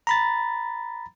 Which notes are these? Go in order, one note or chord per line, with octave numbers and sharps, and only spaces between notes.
A#5 B5 A6